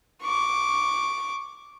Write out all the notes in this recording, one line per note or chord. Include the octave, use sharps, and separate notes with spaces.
C#6 D6